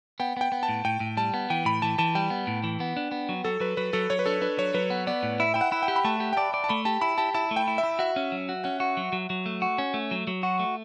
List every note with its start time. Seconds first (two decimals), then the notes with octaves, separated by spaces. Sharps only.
0.20 B3 G5
0.37 B3 G5
0.52 B3
0.63 A5
0.69 A2
0.85 A2 G5
1.00 A2
1.17 G3 A5
1.34 B3
1.50 E3 G5
1.65 A2 B5
1.82 E3 A5
1.98 E3 A5
2.15 G3 G5
2.30 B3
2.47 A2
2.64 E3
2.80 B3
2.97 D4
3.12 B3
3.29 F#3
3.44 F#3 A4
3.60 F#3 B4
3.77 F#3 B4
3.93 F#3 A4
4.10 F#3 C#5
4.19 B4
4.26 D4 A4
4.42 D4 B4
4.58 F#3 C#5
4.74 F#3 B4
4.90 B3
5.07 B3 D5
5.23 A2
5.40 E4 E5
5.54 E4 G5
5.61 F#5
5.72 E4
5.83 G5
5.88 G4
5.96 B5
6.04 A3 A5
6.20 G4
6.33 G5
6.37 D5 A5
6.54 D5
6.64 A5
6.69 A3 B5
6.85 G4 A5
7.01 E4 B5
7.18 G4 A5
7.34 E4 A5
7.51 A3
7.56 G5
7.68 E4
7.78 E5
7.83 E4
7.99 F#4 E5
8.16 C#4
8.32 F#3
8.49 F#4
8.64 C#4 F#5
8.80 F#4
8.97 F#3
9.13 F#3
9.30 F#3
9.46 A3
9.62 F#4
9.78 C#4
9.94 A3
10.11 F#3
10.27 F#3
10.43 F#4
10.59 A3